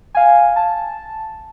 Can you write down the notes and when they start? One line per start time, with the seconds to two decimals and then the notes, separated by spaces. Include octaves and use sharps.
0.15 F5 G#5
0.56 A5